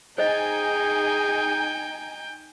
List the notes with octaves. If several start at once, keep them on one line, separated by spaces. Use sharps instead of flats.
D#4 G#4 C5 D#5 G5 G#5